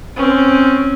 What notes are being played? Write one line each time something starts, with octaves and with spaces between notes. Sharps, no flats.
C4 C#4